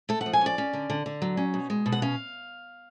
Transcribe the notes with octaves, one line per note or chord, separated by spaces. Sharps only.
A3 A4
F#5
F3
G#5
C#4 D5
C#4
D3
D3
D3
F#3
C#4
B2
G#3
B2
F#5
C#4 F5